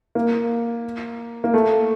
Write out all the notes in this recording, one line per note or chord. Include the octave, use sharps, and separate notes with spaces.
A#3
A#3
A3